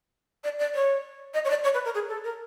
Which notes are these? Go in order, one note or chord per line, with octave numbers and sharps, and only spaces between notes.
D5
D5
C#5
D#5
C#5
D5
C#5
B4
A#4
G#4
A4
A#4